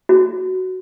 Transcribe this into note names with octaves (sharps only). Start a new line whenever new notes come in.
F#4